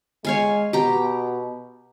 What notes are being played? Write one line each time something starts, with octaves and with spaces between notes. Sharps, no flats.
G#3 C#5 F5 G#5
B2 G4 A#5